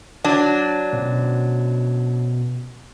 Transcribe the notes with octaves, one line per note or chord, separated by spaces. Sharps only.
F#3 D4
B2 C#4